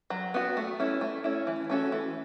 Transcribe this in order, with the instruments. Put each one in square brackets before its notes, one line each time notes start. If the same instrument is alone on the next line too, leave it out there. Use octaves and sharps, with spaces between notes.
[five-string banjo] F#3
B3 F#4
A3
C#4 E4
A3
C#4 E4
E3
A3 C#4 F#4 A4
E3